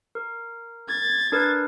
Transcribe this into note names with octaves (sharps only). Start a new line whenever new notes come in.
A#4
G#6 A6
D4 A#4 B4